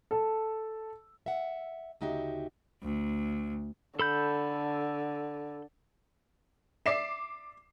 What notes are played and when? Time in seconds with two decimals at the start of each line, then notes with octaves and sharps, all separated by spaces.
0.11 A4 A5
1.26 E5 F#5
2.01 D2 C#3 D#4 F#4 G4 E5
2.83 D2
3.99 D3 A4 B5 G6
6.86 D5 E5 D6 C7 E7